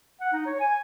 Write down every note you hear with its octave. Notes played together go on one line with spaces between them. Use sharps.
F#5
D#4
C#5
G#5